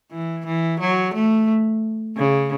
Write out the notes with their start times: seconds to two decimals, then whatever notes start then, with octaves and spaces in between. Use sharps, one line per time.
0.11 E3
0.46 E3
0.80 F#3
1.14 A3
2.17 C#3